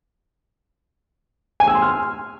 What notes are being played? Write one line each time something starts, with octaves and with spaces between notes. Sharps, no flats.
G#5
E6
C6
F6